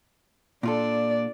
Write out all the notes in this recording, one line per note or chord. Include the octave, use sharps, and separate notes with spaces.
A#2 D4 F4 A4 D5